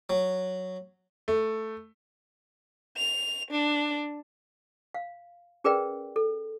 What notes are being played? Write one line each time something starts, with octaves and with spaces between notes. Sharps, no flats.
F#3
A3
F7
D4
F5
C#4 G#4 A#4 B4 D5 G5
A4